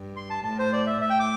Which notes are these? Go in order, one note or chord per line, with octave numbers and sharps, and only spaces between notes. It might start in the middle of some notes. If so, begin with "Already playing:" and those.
Already playing: G2
C6
A5
A2 A5
C5
D5
E5
A2 E5
G5
D6